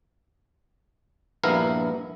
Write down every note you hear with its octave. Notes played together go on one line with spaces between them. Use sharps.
A#1 G2 B3 E4 A#4 F5